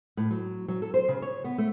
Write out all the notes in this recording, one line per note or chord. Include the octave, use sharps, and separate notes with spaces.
A2
F#3
F#3
A4
C5
C#3
C#5
B3
A3